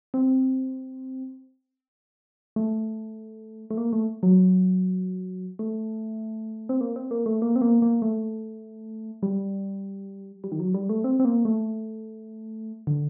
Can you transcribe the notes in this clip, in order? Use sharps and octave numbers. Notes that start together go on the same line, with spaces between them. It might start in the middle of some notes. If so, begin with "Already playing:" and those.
C4
A3
A3
A#3
A3
F#3
A3
C4
A#3
C4
A#3
A3
A#3
C4
A#3
A#3
A3
G3
G3
D#3
F#3
G3
A3
C4
C4
A#3
A3
D3